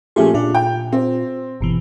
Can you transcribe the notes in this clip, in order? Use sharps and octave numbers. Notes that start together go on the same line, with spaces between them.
A#2 F3 A3 C#4 G4 G#4
A#2 D4 F4
G5
C4
G1 B2 E3